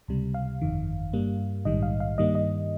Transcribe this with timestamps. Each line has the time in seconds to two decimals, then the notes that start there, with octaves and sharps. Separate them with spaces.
0.08 C#2 C3 G3
0.34 F5
0.61 G1 F2 D#3
1.13 G2 G3 A#3
1.65 A#1 G#2 D#3 G3 D#5
1.83 F5
2.00 F5
2.18 G2 D#3 G3 A#3 D#5
2.35 D#5